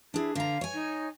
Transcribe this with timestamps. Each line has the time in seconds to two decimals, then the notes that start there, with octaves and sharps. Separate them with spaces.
0.14 D4 E4 G#4
0.35 D3 F5 A#5
0.61 C#5 G#5
0.74 D#4